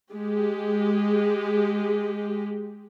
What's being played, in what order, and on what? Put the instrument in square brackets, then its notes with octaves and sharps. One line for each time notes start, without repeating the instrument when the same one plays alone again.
[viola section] G#3 G4